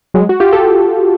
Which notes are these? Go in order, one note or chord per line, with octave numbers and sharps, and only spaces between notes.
F#3 G#3
F#4
F4 G4
G4 A4